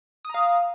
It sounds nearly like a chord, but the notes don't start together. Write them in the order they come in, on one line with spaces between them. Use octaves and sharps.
D#6 A#5 F5